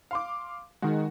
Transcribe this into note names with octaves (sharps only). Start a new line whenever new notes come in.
F5 C6 D6
D#3 G#3 F#4